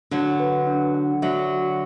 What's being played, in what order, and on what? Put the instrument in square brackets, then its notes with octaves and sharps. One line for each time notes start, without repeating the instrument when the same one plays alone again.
[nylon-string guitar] D3 F#3 [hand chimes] D4
[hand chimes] B4
D4
F#5
[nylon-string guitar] D3 F#3 [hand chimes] E5
[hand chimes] F#4